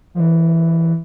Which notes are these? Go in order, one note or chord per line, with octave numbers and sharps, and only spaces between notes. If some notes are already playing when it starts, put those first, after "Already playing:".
F3
E3